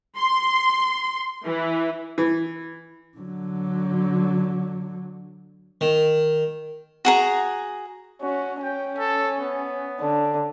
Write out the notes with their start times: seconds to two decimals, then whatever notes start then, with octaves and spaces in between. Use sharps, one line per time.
0.17 C6
1.44 E3
2.18 E3
3.18 D3 F#3
5.81 D#3
7.05 F#4 G#4 A#5
8.22 C#4 F#4
8.63 C#4 G5
8.98 A4
9.39 B3
10.01 D3